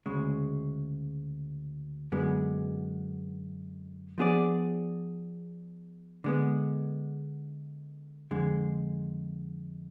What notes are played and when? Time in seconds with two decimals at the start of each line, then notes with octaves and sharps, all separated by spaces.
0.06 D2 C#3 G#3
2.12 F#2 D3 G#3 B3
4.18 F3 B3 D4 G#4 D5
6.24 D3 G#3 B3
8.31 F2 D3 G#3